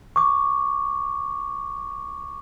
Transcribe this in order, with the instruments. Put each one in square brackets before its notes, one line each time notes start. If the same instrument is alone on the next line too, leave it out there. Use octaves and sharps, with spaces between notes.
[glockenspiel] C#6 D6